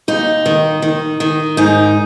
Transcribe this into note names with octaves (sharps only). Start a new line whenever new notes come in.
D#2 D#4
D#3
D#3
D#3
G#2 D#4